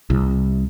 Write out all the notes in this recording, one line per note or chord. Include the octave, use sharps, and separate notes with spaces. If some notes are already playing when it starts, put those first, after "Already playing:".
C2